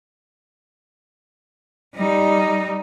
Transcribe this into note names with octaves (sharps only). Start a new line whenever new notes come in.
G3 D#4